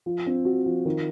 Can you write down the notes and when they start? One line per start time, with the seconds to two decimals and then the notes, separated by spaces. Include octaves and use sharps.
0.06 F3
0.26 C4
0.45 F#4
0.66 F3
0.85 D#3